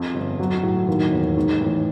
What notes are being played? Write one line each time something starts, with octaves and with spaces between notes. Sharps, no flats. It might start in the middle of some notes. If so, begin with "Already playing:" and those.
Already playing: F2
G1
F#3
A2
D#2
E1
G#2
A1